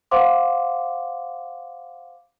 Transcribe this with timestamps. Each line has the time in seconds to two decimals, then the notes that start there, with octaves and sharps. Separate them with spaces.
0.11 C5 F5 F#5 C6 D6